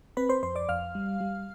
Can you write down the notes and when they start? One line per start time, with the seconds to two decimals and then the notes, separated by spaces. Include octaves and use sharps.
0.17 C4 B4 B5
0.29 C5 C6
0.43 F2 C5 C6
0.55 D5 D6
0.69 F2 F5 F6
0.95 G3
1.21 G3